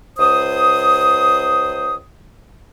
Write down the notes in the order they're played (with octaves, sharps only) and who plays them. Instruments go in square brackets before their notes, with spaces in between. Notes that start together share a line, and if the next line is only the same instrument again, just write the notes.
[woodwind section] C#2 C5 D#6